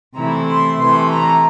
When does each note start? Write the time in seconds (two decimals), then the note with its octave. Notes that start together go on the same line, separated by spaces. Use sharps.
0.15 C3 E3 A3 E4 A#5
0.47 C6
0.79 C3 E3 A3 C6
1.11 A#5